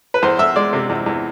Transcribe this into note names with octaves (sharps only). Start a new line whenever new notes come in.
B4
E2 C5
E2 E5
G#3 D5
C3
E2
E2